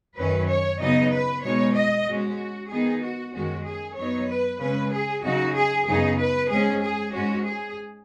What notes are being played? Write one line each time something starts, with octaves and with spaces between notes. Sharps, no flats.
F#2 D#3 F#3 C#4 B4
C#5
C#3 F#3 B3 D#4 D#5
B4
B2 G#3 D#4 C#5
D#5
G#2 G#3 C#4 F#4
D#3 B3 D#4 G#4
F#4
F#2 D#3 G#3 C#4 F#4
G#4
F#2 F#3 B3 D#4 C#5
B4
C#3 G#3 C#4 B4
G#4
C#3 F#3 D#4 F#4
G#4
F#2 C#3 B3 D#4 G#4
B4
G#2 G#3 C#4 G#4
G#4
G#2 G#3 C#4 F#4
G#4